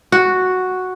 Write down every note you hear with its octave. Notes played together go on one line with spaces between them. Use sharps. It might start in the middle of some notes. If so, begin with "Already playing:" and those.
F#4